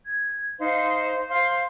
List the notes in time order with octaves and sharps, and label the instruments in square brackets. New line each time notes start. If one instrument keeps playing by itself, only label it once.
[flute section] G#6
D#4 C5 F5
C5 F5 C6